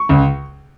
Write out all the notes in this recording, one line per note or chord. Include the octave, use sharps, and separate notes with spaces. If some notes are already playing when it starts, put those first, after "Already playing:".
Already playing: C#6
C#2